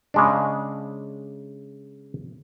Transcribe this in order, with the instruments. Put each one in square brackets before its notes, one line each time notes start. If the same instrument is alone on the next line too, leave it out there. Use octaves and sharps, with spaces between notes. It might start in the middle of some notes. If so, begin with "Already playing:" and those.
[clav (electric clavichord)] C#3 G#3 D4